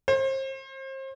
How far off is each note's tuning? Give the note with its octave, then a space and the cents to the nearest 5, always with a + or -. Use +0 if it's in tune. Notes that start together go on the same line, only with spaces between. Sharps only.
C5 +35